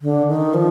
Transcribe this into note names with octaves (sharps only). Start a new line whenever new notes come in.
D3
D#3
F3